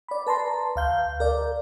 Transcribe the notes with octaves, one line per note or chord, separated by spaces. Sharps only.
D5 B5
B4 A5 A#5 C6
D2 F5 G6
A#4 D5